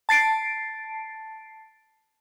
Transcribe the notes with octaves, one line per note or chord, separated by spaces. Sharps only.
A5 A6 C7 D7